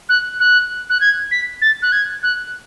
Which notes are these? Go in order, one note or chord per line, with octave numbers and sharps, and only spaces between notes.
F#6
F#6
F#6
G#6
B6
A6
F#6
G#6
F#6